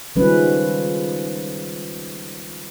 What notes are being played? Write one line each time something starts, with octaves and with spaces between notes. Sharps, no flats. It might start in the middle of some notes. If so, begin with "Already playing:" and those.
D#3 F3 G3 G#3 C#4 B4